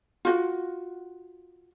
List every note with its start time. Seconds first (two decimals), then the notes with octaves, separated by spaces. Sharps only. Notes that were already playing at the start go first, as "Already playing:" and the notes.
0.25 F4 F#4